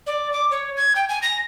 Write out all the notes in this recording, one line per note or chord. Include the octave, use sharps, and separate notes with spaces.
D5
D6
C#5
G#6
G5
G#5
A#6